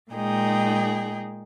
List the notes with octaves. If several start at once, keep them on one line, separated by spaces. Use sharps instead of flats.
A#2 G#3 D#4 G#4 G5